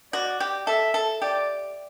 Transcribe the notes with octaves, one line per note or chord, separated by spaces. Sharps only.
F#4 D5
G4
A4 E5
A4
G4 D5